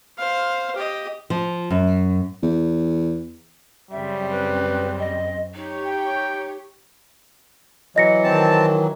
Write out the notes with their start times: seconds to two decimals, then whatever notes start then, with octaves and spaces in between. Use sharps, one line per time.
0.18 C5 F5
0.76 G4 D#5
1.30 F3
1.70 F#2
2.43 E2
3.91 F#2 C#3 G3 C4 E5
4.30 B4
4.99 D#5
5.54 D#4 G4 C#5
5.86 G5
7.96 E3 F#3 D#5 A#6 C#7
8.24 D#3 C4 A5